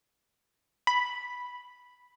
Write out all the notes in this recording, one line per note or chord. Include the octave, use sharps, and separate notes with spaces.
B5